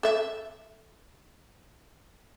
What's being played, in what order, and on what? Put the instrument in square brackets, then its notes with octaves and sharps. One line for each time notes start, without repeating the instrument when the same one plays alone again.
[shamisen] A4 E5